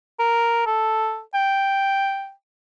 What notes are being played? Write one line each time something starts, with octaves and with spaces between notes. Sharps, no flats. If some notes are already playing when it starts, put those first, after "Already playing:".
A#4
A4
G5